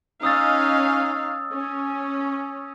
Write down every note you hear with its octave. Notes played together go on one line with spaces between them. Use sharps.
C#4 D#4 F5 D#6 E6 A6
C#4